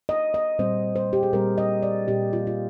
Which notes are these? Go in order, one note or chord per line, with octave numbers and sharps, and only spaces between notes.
D#5
D#5
A#2 G3 C4 C5
C5
G4
G#4
A#2 G3 C4 A#4
D#5
D5
A#2 G3 C4 G4
F4
F4